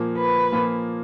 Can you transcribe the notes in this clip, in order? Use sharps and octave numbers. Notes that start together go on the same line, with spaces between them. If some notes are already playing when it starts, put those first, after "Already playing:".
Already playing: A#2 F3 A#3
B4
A#2 F3 A#3